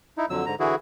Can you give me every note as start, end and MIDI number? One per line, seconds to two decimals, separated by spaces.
0.18 0.26 63
0.18 0.26 64
0.30 0.46 41
0.30 0.46 50
0.30 0.46 54
0.30 0.46 88
0.46 0.55 44
0.46 0.55 50
0.46 0.55 82
0.60 0.75 50
0.60 0.75 52
0.60 0.75 64
0.60 0.75 66
0.60 0.75 68